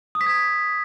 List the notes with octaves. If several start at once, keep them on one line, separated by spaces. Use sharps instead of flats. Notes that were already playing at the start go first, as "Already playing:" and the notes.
D#6
B6
G#6